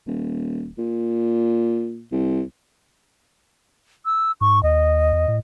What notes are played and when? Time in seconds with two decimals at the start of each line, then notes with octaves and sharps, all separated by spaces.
0.07 D#1
0.78 A#2
2.12 C2
4.05 E6
4.41 G#2 C#6
4.63 D#2 D#5
5.13 E2
5.28 A2